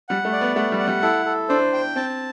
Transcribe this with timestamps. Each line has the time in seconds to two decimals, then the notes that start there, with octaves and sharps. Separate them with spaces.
0.09 G3 F#5
0.25 A3
0.33 D5
0.41 B3
0.56 A3 F#5
0.72 G3
0.79 F#5
0.87 G3
1.02 E4 A4
1.25 A4
1.49 D4 C5
1.73 G5
1.96 C4 A5